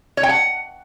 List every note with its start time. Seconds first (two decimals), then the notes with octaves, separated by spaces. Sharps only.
0.17 C#5
0.23 G5
0.29 F#5